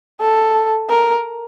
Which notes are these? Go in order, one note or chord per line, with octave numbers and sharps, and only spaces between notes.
A4
A#4